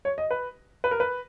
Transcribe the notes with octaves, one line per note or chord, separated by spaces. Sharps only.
C#5
D#5
B4
B4
A#4
B4